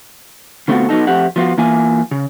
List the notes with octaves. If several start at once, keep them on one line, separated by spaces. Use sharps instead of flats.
D3 A3 B3 C4 F4 F#4
F#3 B3 D#4 A4
F2 A3 C4 G4 F#5
F3 B3 F4 F#4
E3 A#3 F4 G#5
C#3